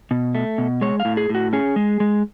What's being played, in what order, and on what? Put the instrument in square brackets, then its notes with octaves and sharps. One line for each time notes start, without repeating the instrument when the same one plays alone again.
[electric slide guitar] B2
A3
B2
G#3 C#5
F5
A2
G#4
A2
F#4
C#4 G#4
G#3
G#3